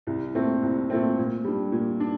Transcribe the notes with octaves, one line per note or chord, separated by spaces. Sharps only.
C2
A#2 A3 C4
C2
A#2 A3 C4
A#2
G3 D4
A#2
D4